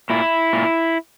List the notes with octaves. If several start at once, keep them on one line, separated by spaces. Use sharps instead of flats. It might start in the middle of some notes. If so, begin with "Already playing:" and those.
A#2 E4
A#2